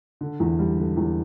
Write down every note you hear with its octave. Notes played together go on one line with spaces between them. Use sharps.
D3
E2
G3
D3
E2